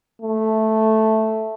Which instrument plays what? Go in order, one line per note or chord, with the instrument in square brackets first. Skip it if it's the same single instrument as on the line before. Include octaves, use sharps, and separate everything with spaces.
[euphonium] A3